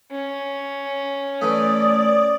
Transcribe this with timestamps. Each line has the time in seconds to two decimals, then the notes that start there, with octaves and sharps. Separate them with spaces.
0.11 C#4
1.41 E3 A3 D5 D#6